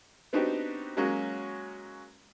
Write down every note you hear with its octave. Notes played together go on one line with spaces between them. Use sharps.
B3 C4 D4 D#4 F#4 G4
F#3 G#3 A#3 C#4 F#4